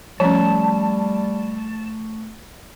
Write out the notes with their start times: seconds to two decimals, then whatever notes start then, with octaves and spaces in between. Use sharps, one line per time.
0.20 F3 G3 A3 C#4 A5 C#6